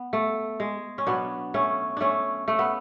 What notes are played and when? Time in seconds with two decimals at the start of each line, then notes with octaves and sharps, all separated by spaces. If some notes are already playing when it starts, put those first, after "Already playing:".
Already playing: B3
0.13 A3
0.60 G#3
0.98 C#4
1.07 B2 F#3 B3 D4
1.54 A3 C#4
1.97 A3 C#4 D4
2.48 A3
2.59 B3